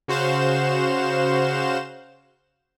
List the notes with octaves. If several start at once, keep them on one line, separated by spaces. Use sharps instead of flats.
C#3 F#4 C5 F5 E7